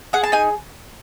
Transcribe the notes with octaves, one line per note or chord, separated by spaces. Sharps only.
G#4 F#5
A5
D#4 G#5